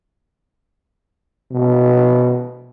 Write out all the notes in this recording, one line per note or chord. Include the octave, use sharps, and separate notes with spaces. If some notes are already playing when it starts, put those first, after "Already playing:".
B2